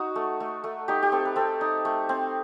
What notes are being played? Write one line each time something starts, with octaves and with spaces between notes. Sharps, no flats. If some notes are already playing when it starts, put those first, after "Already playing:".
Already playing: D#4 F#4
A3
A3
A3
D#4 G4
G4
C4 A4
B4
C4 A4
D#4
A3
C4